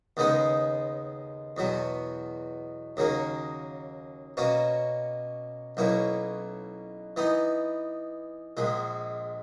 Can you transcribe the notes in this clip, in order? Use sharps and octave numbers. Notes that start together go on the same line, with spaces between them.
D#2 C#3 G#3 B3 D#4
E2 B2 F#3 B3
D#2 C#3 F#3 A#3
B2 A#3 C#4 F#4
B1 B2 A#3 C#4 E4
E3 B3 D#4
A#1 A#2 G#3